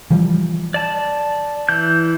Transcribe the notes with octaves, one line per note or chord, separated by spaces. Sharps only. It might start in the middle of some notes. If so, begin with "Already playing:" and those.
E3 F3 G3
D5 A5
E3 G6